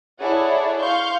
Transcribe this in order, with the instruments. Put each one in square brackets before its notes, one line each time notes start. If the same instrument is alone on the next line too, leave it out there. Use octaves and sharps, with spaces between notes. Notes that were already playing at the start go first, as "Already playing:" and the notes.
[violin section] E4 G#4 A4 C#5 D5 F#5
F5 C6 C#6 G6